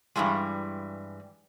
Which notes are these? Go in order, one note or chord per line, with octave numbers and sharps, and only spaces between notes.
G2 C#3 E3 G3 G#3